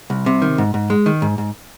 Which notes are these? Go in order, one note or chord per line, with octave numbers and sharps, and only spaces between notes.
C2
C3
D#3
G#2
G#2
G#3
D#3
G#2
G#2